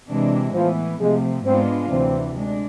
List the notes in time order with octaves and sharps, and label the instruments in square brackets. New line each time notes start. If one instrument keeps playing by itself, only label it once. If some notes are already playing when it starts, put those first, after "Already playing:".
[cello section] C3 E3 G#3 D4
[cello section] A2 E3 B3 [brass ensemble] F3
[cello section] C3 F3 A3 [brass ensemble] G#3
[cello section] G#2 G#3 B3 D4 F4 [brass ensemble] C4
[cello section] D2 C3 E3 [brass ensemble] C4
[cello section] G#3 D4